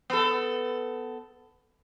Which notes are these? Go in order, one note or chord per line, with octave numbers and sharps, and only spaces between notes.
B3 A4